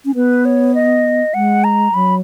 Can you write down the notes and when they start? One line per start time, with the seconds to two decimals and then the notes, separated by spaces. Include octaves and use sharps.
0.05 C#4
0.15 B3 B4
0.45 C#5
0.75 D#5
1.34 G#3 F#5
1.64 A#5
1.94 F#3 B5